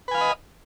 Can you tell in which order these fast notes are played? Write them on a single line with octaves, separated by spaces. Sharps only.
B4 G#5 F5 B5 D#5